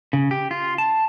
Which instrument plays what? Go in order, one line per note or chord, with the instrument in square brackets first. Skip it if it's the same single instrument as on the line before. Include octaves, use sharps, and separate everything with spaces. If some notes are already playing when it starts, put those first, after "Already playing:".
[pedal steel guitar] C#3
G4
F4
A5